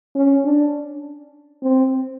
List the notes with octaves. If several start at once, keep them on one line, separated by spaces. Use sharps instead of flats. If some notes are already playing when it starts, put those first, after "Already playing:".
C#4
D4
C4